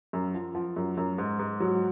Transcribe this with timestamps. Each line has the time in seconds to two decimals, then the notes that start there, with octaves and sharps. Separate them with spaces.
0.13 F#2
0.34 F3
0.55 F3
0.76 F#2
0.97 F#2
1.18 G#2
1.39 G#2
1.60 F#3